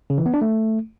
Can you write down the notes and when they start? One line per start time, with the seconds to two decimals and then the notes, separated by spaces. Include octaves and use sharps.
0.10 C#3
0.18 E3
0.26 B3
0.34 D4
0.42 A3